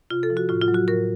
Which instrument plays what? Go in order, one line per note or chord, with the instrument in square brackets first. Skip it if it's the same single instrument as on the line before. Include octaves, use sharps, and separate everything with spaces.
[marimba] C3 F4
A4
F3
F#4
A2 F4
F4
F#3
F#4
A2 A#4